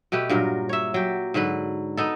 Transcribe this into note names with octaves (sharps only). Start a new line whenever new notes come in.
B2 A3 G4 B4
G2 A#2 F#3 A#4
C#5 E5
F#3 G4
G#2 D3 F#3 B4
B3 D#4 A4